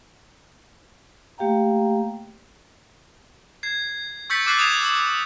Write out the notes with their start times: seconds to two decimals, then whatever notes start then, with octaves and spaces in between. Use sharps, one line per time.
1.38 A3 A#3 G4 F5 G5 A#5
3.63 G#6 C7
4.30 C#6 E6 G6 A6 B6 C#7
4.46 D6 E6 F#6 A6 C7
4.59 D#6 G#6 A6 C7 E7 F7
4.83 E6